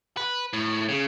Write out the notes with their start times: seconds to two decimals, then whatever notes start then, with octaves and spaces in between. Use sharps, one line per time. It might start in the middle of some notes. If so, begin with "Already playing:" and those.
0.17 B4
0.53 A2
0.89 C#3